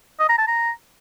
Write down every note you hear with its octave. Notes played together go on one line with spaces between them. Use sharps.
D#5
A#5
A5
A#5